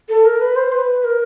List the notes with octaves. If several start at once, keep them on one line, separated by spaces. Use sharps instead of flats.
A4
A#4
B4
C5
B4
A#4